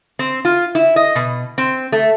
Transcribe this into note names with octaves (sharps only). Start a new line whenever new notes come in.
C4
F4
E4
D#5
B2
C4
A3